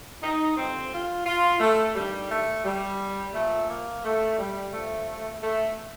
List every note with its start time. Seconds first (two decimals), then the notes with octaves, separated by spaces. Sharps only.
0.22 D#4
0.56 G2 D3 F3 C4
0.92 F4
1.25 F4
1.60 A3
1.95 G2 D#3 G3
2.30 A3
2.64 G3
3.34 A#2 F3 A3
3.69 A#3
4.04 A3
4.39 G3
4.72 G2 D3 F3 A3
5.42 A3